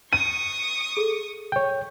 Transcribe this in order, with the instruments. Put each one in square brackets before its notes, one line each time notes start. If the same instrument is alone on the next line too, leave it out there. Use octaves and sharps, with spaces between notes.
[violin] C#6 D#6 [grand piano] D#7
[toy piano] G#4 A4
[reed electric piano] C#5 G5